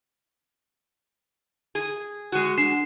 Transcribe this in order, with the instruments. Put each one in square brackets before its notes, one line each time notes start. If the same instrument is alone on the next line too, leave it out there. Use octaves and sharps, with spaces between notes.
[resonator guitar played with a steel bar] G#4
G#3 F#4
[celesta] D4 C7 E7